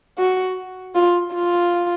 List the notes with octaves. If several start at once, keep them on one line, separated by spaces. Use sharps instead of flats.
F#4
F4
F4